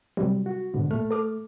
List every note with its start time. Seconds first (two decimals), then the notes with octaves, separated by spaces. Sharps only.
0.17 C3 F#3 G3
0.46 F#4
0.74 G#2 B2 D3
0.91 A#2 A3 F6
1.11 A4 D6 F6